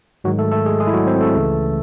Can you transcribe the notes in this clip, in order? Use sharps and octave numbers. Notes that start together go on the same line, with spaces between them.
G#2 D#3 F#3 G#3 F#4
A3 A4
A3 A4
G#3 G#4
G#3 G#4
E4
F#3 F#4
C4 C5
A3 A4
C#2 C#3 E3